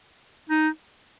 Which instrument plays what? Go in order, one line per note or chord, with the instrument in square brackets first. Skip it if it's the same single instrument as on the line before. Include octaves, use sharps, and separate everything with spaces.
[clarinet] D#4